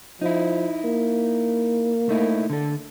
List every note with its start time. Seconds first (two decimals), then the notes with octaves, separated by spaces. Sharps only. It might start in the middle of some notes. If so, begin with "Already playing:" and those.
0.21 F3 D#4 E4
0.85 A#3
2.09 A3 D#4 E4
2.50 D3 A4